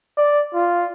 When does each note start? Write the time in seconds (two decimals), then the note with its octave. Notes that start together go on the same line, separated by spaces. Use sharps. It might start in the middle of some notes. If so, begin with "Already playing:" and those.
0.17 D5
0.54 F4